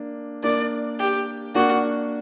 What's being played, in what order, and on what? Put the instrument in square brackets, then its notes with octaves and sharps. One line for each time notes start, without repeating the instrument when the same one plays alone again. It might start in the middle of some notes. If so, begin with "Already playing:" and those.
Already playing: [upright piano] A#3 D4
[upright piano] A#3 D4 [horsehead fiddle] D5
[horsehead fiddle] G4
[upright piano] A#3 D4 [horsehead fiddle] F#4